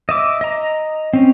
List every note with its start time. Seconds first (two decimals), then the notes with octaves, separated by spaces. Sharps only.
0.09 D#5 E5 D6
0.41 D#5 A#5
1.13 C4 C#4